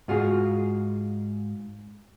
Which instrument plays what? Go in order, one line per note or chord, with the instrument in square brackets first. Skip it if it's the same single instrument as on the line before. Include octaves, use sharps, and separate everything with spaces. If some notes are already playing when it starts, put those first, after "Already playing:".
[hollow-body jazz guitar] G#2 F4 F#4 G#4